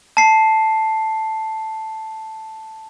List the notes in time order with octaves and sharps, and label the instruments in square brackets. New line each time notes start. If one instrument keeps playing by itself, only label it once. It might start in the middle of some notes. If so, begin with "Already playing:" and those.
[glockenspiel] A5 C7